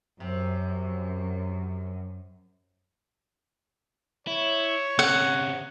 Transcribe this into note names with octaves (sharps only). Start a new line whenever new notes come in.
F#2 C3
E4 C#5
C#3 C4 F#5